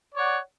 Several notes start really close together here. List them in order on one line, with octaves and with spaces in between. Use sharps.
D5 C#5 F#5